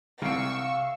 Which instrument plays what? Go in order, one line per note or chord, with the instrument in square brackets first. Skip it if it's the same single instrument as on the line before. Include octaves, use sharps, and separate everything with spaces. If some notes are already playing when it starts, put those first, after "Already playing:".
[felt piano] C2 C7 D7 [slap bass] C3 [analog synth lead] F5 [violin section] C#6 E6